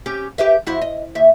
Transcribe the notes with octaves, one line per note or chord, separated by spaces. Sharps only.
C#4 G4
G4 B4 E5
F2 E4 F#4
D#5
D#2 E5